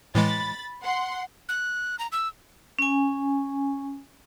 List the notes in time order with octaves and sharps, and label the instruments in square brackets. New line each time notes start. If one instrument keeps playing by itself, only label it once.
[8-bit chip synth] A2 E3 G#3 [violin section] B5 A6
[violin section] F#5 C6
[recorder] F#6
A#5
E6
[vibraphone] C#4 G#5